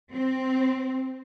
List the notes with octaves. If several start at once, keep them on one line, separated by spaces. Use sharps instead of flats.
C4